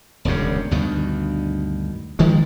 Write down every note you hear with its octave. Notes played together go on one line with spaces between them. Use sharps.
E1 D2 G2 C#3
D2 G2 B2 D#3
F#1 D#3 F3 G#3